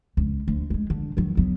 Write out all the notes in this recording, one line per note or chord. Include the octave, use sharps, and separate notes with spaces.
C#2
D2
F#3 G#3
D3
D#3 F#3
F#3 B3